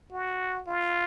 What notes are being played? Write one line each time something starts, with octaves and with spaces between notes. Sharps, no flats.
F#4
F4